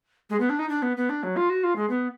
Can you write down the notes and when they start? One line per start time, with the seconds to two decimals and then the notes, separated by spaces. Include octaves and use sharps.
0.30 G#3
0.40 B3
0.49 D4
0.59 D#4
0.69 D4
0.82 B3
0.97 B3
1.09 D4
1.23 F#3
1.36 F4
1.49 F#4
1.63 F4
1.76 G#3
1.90 B3